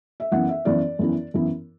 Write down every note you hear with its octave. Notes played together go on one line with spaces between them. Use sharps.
E5
F#2 E3 B3 E4 F#5
E5
F#2 E3 B3 E4 D5
F#2 E3 B3 E4
F#2 E3 B3 E4